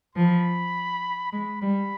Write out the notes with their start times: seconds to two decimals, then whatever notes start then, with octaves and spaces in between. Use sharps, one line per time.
0.15 F3 B5
1.32 G#3 B5
1.61 G3 B5